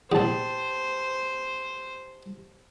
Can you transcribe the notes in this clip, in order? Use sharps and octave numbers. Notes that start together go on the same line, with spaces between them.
A#1 E2 G4 C5 A5